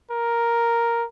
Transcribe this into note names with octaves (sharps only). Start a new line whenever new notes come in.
A#4